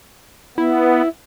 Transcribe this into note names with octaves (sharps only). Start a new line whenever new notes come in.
B3 E4